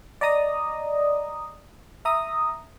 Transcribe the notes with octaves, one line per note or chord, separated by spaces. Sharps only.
D5 D#5 A#5 D#6
E5 A#5 D#6